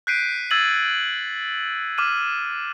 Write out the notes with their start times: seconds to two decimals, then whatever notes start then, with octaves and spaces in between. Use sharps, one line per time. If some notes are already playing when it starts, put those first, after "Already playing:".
0.07 F#6 G6 B6 C7 D7 D#7
0.51 E6 G#6 A6 C7 D#7 F#7
1.98 D6 F6 D#7